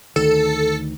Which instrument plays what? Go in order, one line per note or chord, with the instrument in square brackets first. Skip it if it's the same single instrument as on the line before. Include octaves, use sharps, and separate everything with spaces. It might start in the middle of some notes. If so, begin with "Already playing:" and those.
[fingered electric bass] D2 D#3 [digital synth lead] A4